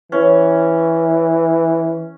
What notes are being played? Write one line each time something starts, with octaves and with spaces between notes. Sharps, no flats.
E3 C#4